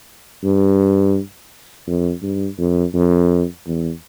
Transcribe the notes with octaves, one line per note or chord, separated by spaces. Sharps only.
G2
F2
G2
F2
F2
E2